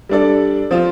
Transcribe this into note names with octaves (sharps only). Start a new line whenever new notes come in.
G3 D4 A4 D5
F3 C4 F4